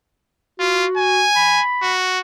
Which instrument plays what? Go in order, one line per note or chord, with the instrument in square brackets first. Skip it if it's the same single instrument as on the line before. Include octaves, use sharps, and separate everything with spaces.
[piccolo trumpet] F4 [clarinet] F#4
[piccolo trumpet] G#5
[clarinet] B5
[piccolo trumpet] F#4